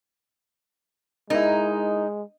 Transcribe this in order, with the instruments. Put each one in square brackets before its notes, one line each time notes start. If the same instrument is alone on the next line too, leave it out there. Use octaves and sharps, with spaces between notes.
[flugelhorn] G#3 [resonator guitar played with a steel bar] D#4 [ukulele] E4 A#4